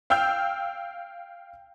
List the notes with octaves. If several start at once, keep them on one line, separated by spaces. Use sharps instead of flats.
F5 G5 E6 F6 G6